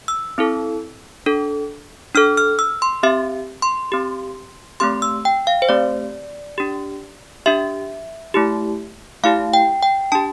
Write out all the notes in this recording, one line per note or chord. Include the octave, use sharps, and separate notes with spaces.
E6
C4 E4 A4
D4 A4
D4 A4 F6
F6
E6
C6
C4 G4 E5
C6
C4 G4
A3 C4 G4 C6
E6
G5
F5
C5
A3 C4 G4 D5
D4 G4
D4 G4 E5
A3 E4 G4
A3 E4 G4 F5
G5
G5
D4 G4 A5